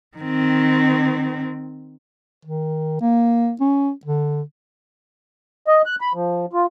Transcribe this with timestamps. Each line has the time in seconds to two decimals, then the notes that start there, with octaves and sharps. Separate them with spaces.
0.18 D#3 C4
2.45 D#3
3.01 A#3
3.61 C#4
4.06 D3
5.67 D#5
5.86 F#6
6.01 B5
6.14 F3
6.53 F4